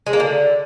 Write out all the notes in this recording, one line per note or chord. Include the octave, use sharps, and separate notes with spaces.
G#3
A#3
D3